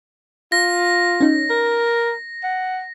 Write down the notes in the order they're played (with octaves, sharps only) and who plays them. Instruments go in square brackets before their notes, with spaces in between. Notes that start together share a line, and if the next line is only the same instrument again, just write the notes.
[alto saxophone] F4 [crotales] A#6
[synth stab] C#4 D#4
[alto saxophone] A#4
F#5